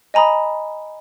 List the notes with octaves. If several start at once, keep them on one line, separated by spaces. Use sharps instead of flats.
D#5 G#5 A#5 B5 D#6